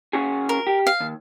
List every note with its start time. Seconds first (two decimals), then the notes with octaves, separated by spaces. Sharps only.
0.13 C#4 F#4 G#4
0.49 A#4
0.67 G4
0.87 F5
1.00 D#2